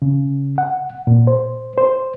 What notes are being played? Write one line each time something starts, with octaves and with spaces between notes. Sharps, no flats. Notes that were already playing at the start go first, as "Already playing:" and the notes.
C#3
F#5
A#2
C5
C5